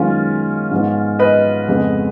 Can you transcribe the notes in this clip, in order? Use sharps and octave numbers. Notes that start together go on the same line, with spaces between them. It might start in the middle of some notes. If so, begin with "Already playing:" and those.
Already playing: F#2 D#3 G#3 B3 C#4 F4
G#2 F3 G#3 B3
B4 D#5
F2 C#3 G#3 B3